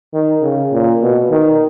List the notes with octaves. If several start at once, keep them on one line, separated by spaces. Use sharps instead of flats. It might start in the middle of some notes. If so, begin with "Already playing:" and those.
D#3
C#3
A#2
B2
D#3